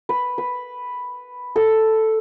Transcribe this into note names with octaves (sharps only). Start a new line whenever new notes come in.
B4
B4
A4